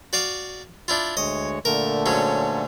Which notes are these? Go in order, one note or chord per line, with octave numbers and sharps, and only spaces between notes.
F#4 D5 F5
D4 E4 F4
D2 G#3 C#5 D#5
A#2 D3 A3 A#4
G#2 F#3 C#4